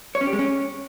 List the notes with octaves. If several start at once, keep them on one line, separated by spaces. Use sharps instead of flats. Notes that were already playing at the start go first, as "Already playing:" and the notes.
C#5
C#4
G4
G#3
C#4